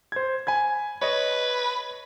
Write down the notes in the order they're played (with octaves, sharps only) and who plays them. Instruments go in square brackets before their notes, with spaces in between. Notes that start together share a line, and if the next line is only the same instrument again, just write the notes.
[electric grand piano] C5 G#6
G#5 B5 G#6
[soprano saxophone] B4 [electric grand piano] C#5 D#5